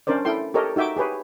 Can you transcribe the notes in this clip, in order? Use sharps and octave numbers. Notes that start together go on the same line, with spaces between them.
C#4 D4 A#4 C5 D5
E4 A4 G5 C6
G4 A4 A#4 C#5 D#5
D#4 F#4 E5 G5 D6
G4 G#4 B4 C#5